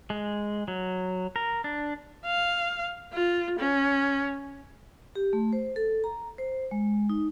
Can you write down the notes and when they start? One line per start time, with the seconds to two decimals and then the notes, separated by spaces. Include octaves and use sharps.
0.10 G#3
0.68 F#3
1.36 A#4
1.64 D4
2.26 F5
3.13 F4
3.59 C#4
5.15 G4
5.33 A3
5.53 C5
5.76 A4
6.04 A#5
6.38 C5
6.71 G#3
7.10 D#4